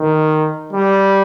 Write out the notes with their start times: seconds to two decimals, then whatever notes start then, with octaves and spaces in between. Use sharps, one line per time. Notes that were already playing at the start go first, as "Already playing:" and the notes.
Already playing: D#3
0.73 G3